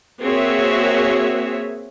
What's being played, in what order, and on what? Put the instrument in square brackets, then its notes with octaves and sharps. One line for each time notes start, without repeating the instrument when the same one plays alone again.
[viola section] A#3 C4 F#4 G#4 C#5 E5